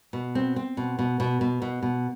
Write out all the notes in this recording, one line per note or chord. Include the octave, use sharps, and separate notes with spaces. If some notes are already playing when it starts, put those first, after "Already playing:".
B2
C4
C4
B2
B2
B2
B2
B2
B2